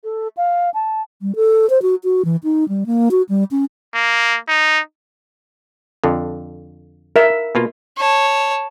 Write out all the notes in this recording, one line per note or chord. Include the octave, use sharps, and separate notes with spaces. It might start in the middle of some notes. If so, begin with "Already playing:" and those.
A4
F5
A5
G3
A4
C5
F#4
F#4
E3
D#4
G3
A#3
F#4
G3
C#4
A#3
D#4
F2 D3
A#4 E5
B2 A#3 F4
C#5 A5